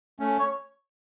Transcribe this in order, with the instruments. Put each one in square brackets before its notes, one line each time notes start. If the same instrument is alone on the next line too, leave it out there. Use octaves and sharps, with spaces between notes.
[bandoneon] A3 C#4
[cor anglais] C#5